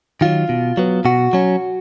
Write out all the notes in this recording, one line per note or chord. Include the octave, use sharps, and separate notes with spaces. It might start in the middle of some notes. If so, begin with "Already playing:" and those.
D#3 F#3 F4
B2
F#3 B3
B2 F#4
F#3 C#4